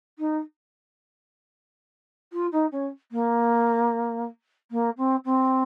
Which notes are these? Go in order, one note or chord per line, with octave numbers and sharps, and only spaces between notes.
D#4
F4
D#4
C#4
A#3
A#3
C4
C4